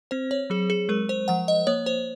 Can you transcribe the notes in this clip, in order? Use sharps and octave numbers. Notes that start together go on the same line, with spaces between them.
C4 C5
C#5
F#3 G#4
G#4
G#3 A#4
C5
F3 F#5
D#5
A#3 C#5
C5